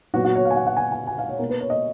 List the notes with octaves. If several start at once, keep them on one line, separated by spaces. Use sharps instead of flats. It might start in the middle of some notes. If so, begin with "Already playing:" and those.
A#2 F#3 B3 F#4
F#4
C#5
F5
G#5
F#5
F#5
G#5
G#5
G#5
F5
C#5
B2 A#3 A#4
B4
C#5
D#5